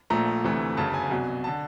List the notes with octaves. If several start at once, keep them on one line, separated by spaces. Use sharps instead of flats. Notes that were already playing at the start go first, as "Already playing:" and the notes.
A#1 A#2 F3 A3 A#5
D2 C3 E3 A3
G1 F#2 C#3 A5
G#5
C2 B2 F#3
D3 A5